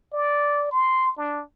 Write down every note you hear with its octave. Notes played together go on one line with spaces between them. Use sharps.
D5
C6
D4